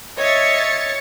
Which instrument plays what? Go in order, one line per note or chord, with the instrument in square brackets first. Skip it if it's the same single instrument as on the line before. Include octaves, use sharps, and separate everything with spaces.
[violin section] C#5 A6 C#7 [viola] D#5 E5